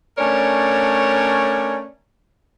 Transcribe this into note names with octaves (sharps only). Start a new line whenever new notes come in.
A3 C#4 D4 A#4 C#5 D5